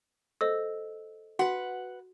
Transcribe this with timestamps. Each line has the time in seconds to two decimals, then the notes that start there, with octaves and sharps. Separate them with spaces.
0.41 A4 C5 D#5 E6
1.39 F#4 B4 F#5